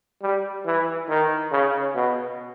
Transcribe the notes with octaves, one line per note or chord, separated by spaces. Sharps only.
G3
E3
D#3
C#3
B2